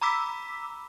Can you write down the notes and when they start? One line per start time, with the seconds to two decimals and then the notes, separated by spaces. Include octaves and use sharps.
0.01 A#5 B5 D6 E6 B6